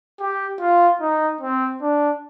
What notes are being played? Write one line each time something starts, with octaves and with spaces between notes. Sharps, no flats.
G4
F4
D#4
C4
D4